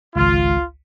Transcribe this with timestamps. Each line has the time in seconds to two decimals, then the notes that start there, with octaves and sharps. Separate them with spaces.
0.16 G#1 C#2 F4